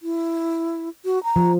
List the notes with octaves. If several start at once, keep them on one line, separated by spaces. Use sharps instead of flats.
E4
F#4
A#5
F3